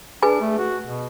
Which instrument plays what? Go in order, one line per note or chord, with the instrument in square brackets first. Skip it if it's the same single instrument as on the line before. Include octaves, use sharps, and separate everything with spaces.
[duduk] D4 [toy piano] G#4 B4 G#5
[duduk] A3
F#4
B2